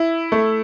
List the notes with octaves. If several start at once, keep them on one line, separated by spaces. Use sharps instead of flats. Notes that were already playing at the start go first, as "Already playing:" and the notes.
Already playing: E4
A3